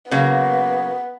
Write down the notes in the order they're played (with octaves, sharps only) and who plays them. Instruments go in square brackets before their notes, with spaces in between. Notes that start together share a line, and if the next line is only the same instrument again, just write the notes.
[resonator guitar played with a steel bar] C#3 F#3 A#3 [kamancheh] B3